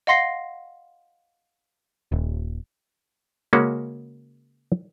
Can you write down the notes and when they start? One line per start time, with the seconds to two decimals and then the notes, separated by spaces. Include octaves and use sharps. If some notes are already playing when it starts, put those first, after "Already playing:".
0.07 D#5 F5 F#5 C6 A#6 C7
2.12 D#1
3.53 C#3 G#3 A#3 C#4 F#4